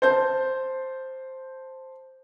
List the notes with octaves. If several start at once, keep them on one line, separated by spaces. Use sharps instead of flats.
C5 A5 G6